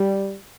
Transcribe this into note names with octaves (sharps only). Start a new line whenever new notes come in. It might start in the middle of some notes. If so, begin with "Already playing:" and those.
Already playing: G3